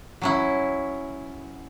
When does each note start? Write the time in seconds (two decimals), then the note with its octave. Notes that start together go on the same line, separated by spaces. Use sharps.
0.22 F#3 C#4 E4